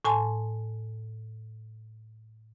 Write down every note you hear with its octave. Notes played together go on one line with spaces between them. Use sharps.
A2 G#5 A5 C6